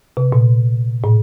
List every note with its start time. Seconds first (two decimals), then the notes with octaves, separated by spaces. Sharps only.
0.17 C3
0.32 A#2
1.04 A2